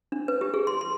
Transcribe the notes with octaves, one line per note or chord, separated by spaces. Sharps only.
D4
B4
G4
G#4
C6
C6